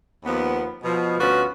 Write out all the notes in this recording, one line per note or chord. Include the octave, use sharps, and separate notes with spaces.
D#2 F3 B3
B2 F3
D2 B3 C#4 F4 F#4